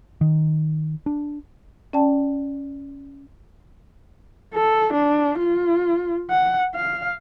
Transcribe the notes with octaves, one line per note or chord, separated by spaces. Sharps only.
D#3
D4
C#4 D5 G5 A5
A4
D4
F4
F#5
F5